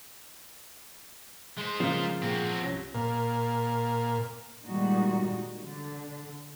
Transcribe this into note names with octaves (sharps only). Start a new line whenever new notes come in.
G#3 C5
C#3 F3 A#3 F4
A#2 G#3 C4 F#4
C2 C#4 A#6
A#2
A#2 D#3 G3 G#3 D#4 F#4
D3